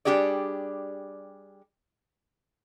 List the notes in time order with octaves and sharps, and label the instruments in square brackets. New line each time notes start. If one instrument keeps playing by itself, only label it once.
[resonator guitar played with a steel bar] G3 D4 G4 G#4 D5